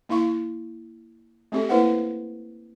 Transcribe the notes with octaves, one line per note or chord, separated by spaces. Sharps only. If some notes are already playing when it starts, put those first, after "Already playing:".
A#3 E4 F5 C#6
A3 C4 G4 A4
A#3 E4 B4 C5 F5 F#5